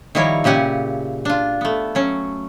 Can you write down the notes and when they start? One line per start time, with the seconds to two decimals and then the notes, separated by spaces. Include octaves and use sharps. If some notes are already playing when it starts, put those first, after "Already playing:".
0.15 D#3 F3 G3 E4 A#4 C#5
0.44 A#2 C#3 G4 F#5 G#5
1.25 D4 F4
1.61 A3 B3
1.95 F#3 C#4